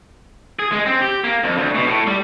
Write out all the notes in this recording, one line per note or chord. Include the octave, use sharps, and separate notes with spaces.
G#4
G#3
C4
G4
A#3
F2
D2
B2
A2
G3